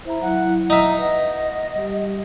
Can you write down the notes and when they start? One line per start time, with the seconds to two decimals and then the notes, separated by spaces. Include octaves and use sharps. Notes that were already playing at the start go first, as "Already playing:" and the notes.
0.05 E4 C5 E5 A#5
0.22 F#3 E4 F#5
0.70 D#4 E5 A#5
0.98 B4 D#5 F#5
1.36 F#5
1.75 G3 G4